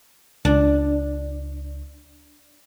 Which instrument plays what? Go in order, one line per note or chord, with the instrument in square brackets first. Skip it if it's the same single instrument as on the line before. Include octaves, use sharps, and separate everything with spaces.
[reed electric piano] C#2 [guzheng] D4